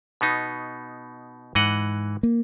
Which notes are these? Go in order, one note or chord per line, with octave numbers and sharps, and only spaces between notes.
B2 B3 D#4
G#2 E3 D#5 F#5
A#3